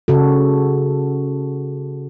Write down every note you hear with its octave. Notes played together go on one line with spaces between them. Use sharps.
C#3 F#4 A4